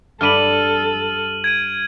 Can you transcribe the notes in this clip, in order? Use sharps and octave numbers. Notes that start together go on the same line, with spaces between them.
G2 A4 D5 B5 F6 D#7 F#7
G#6 D7 D#7